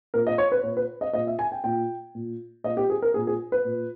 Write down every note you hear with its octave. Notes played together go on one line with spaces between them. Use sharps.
A#2 A#4
D#5
C#5
B4
A#2 C#5
B4
D#5
A#2 D#5
E5
G#5
G5
A#2 G5
A#2
A#2 D#5
G4
G#4
A#4
A#2 G#4
G#4
B4
A#2